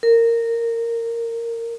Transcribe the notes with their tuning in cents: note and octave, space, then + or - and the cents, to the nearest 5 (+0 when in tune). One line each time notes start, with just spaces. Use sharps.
A#4 -15